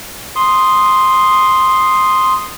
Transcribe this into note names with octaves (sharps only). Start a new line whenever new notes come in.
C6 D#6